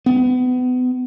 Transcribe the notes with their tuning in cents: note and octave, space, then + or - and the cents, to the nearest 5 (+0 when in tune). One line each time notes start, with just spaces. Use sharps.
B3 +30